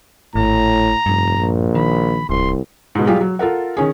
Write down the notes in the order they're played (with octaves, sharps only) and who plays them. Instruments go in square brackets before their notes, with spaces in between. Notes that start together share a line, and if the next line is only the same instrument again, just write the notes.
[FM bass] G#1 [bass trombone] A2 [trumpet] A#5
[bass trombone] F1 [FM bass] G2
[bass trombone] A#1
[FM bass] D#3 [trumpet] B5
[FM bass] D1 [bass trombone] C2 [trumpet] C6
[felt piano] G#2 B2
F#3 G3 F4 G4 G#4 F5
F#3
F4 A4 A#4 F#5
D#3 C#4 G#4